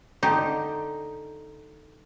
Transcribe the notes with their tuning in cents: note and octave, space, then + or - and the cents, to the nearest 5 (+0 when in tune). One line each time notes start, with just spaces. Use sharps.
D3 +0 D#4 +0 G4 +0